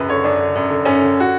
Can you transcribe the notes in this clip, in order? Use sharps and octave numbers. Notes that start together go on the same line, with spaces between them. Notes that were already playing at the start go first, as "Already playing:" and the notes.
Already playing: C#2 F#2 B4
D3 C#5
F#2 D4
D3
F#2
D3
F#2 C#4
D3
F#4